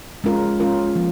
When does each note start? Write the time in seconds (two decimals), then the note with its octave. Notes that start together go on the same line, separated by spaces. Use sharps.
0.24 G#3 C#4 F4 A#4
0.60 G#3 C#4 F4 A#4
0.95 F3 A#3